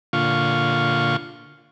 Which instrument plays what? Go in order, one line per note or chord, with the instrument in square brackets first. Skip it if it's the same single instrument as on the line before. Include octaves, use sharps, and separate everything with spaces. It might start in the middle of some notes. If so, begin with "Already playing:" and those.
[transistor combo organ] A#2 D3 F4 F5 C#6